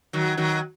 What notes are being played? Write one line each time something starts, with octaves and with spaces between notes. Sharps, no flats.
D#3 F#3
D#3 F#3